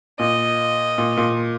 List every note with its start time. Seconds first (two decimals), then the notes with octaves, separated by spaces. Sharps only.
0.19 A#2 D#5
0.98 A#2
1.17 A#2